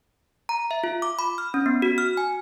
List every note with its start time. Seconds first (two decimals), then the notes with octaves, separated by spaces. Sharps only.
0.49 A#5
0.71 E5
0.84 F4
1.02 D6
1.19 B5
1.38 F6
1.54 C#4
1.66 B3
1.82 F#4
1.98 F6
2.17 G#5